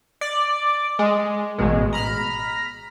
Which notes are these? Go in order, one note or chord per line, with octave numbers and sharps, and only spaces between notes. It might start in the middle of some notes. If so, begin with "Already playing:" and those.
D5
G#3
A1 B2 G#3
A#5 B5 F6